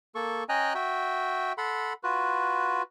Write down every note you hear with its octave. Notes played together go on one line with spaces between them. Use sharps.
A#3 A4 C#6
C#4 D#5 G5 G#5 A#5 F#6
F#4 E5 G5
A4 F#5 B5 C6
F4 F#4 B4